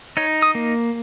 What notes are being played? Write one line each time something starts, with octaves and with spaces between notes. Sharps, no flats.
D#4 C#5
D#6
A#3